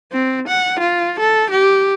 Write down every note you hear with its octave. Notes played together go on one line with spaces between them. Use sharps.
C4
F#5
F4
A4
G4